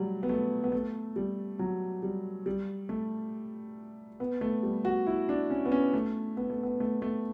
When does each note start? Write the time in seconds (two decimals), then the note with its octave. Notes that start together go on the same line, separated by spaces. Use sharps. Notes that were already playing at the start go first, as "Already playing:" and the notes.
Already playing: F#3 G3 A3
0.23 B3
0.29 A3
0.64 B3
0.72 A3
1.16 G3
1.59 F#3
2.03 G3
2.46 G3
2.89 A3
4.20 B3
4.41 A3
4.63 G3
4.85 F#4
5.07 E4
5.29 D4
5.50 C#4
5.65 B3
5.72 C#4
5.93 A3
6.37 B3
6.50 A3
6.63 B3
6.80 A3
7.02 A3